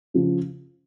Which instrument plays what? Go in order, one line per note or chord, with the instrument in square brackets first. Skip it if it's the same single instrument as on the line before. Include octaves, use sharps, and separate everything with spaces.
[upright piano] C#3 F3